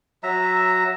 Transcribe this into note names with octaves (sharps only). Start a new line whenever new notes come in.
F#3 E5 A#5